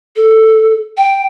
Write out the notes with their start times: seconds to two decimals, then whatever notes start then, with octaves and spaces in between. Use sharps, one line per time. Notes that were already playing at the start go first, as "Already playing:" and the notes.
0.16 A4
0.97 G5